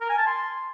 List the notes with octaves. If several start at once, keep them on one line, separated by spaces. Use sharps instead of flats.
A#4
G#5
A5
C6